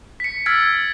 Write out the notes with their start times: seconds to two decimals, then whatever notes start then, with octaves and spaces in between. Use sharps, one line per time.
0.20 B6 C#7
0.46 E6 F6 G#6 A6 B6 D7